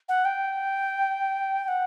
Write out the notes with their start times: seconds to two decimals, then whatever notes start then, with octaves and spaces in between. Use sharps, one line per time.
0.08 F#5
0.25 G5
1.63 G5
1.68 F#5